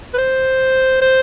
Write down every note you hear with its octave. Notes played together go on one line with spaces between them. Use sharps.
B4
C5
C5